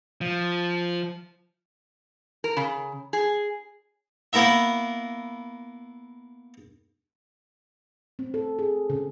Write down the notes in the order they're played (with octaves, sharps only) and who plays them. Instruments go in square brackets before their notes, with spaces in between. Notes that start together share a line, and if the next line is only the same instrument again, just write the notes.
[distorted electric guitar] F3
[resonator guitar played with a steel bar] A#4
C#3
G#4
[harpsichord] A#3 B3 E4 A#4 E5
[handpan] C4
A4
G#4
C#3